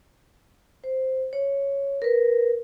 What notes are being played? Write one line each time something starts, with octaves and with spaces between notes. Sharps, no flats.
C5
C#5
A#4 B4